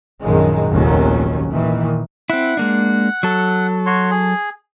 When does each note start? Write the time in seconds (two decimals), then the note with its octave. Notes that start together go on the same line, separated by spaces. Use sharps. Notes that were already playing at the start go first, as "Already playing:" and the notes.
0.22 A#1 F#2 D#3 G#3
0.71 F1 A#1 D#2 D#3 F#3 C#4
1.49 A#2 D#3 E3
2.30 C4 E4 F#5
2.57 G#3 A#3 D4
3.23 F#3 A4
3.86 F#4 C#5 C6
4.11 G#4